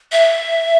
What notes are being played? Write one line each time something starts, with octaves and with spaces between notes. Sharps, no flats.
E5